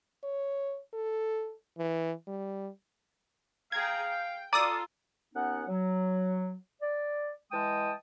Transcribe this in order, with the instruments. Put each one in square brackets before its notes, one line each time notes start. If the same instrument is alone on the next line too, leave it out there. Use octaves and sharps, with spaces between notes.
[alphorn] C#5
A4
E3
G3
[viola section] G#4 G5 A#5 [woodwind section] F5 [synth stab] G#6
[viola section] G5
[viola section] F4 [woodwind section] A4 [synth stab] D5 D#6 [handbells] A#5 E6
[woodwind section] D#2 B3 C#4 D#4 F#5
F#3
D5
E3 G#3 D#5 G5 A5 D#6